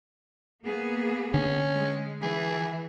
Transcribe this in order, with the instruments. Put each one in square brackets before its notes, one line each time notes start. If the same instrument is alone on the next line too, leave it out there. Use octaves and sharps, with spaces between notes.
[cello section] A#3 B3 G#4
[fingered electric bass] D3 [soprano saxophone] C#4
[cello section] G#3
[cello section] E3 [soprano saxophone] G#4